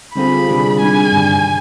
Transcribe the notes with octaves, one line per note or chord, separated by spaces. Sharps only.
D3 G3 C4 F4 G#4 B5
C3 D#3 G3 D4 G#4
C3 D#3 G3 D4 G#4 G#5
G2 D3 G3